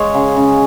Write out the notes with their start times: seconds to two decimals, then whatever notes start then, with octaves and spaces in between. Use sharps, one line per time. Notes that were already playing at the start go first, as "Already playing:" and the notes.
Already playing: G#3 C#5 F5
0.14 C#3
0.37 C#3